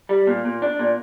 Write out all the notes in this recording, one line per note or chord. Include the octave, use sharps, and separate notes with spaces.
G3
A#2
A#2
D4
A#2